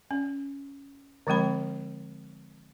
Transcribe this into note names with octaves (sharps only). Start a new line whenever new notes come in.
C#4
D3 F3 G#3 C4 B5